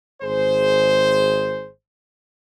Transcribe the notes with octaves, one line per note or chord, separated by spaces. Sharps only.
G#1 G#4 C5